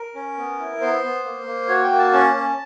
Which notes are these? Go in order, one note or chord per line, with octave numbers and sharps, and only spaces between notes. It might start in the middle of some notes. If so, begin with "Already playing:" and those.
Already playing: A#4
C#4
B3
E4
B3 C5
B3
A#3
A#3
F#4 C#5
G5
A#3
A5
C#4 A5
C#4